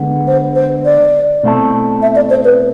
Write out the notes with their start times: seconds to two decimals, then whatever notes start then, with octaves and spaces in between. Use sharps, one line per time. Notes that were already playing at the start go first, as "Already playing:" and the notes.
Already playing: D3 G#3 B3
0.27 C5
0.56 C5
0.85 D5
1.43 B2 A3 C4 E4 A4
2.02 E5
2.16 D5
2.30 C5
2.45 B4